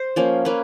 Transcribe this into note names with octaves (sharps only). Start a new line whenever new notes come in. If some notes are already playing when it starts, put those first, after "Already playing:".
Already playing: C5
F3 A#3 C#4
A#3 C#4 B4